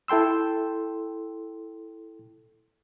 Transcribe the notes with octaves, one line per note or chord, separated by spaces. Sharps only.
E4 A4 G5 C6 E6